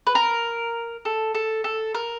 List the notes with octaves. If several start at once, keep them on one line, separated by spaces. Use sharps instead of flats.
B4
A#4
A4
A4
A4
A#4